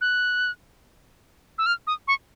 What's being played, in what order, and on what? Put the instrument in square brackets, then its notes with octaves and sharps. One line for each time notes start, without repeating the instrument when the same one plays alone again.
[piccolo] F#6
E6
F6
D#6
C#6